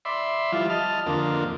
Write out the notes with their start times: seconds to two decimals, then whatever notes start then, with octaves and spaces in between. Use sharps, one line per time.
0.05 D5 E5 B5 C6
0.52 F3 G3 E4 F4
0.70 D#5 A5 F6
1.06 F2 D3 A#3 F4